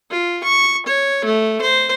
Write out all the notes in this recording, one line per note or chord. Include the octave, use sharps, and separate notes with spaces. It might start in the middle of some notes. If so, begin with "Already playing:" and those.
F4
C#6
C#5
A3
C5